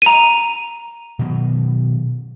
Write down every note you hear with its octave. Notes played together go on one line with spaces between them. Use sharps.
A#5 D#7
B2 D#3 F#3